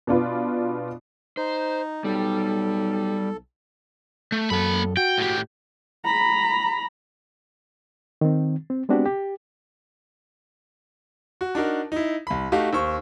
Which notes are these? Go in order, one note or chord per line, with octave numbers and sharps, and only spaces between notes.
B2 D4 F4 B4
D#4 C5
B1 G3 A4
A3
F#2 A#3 A4 B5
F#4 G5
A2 G4
A#5 B5
D#3 C4
C4
G#3 B3 C4 D4 F#4 G4
G4
F#4
D4 D#4 F#4 A#4
D#4 E4
C2 B5
A3 D#4 F#4 G4 F5
D#2 C5 C#6